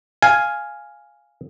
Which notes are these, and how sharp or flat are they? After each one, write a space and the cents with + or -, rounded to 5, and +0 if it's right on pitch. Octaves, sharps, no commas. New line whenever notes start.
F5 +0 G#5 +0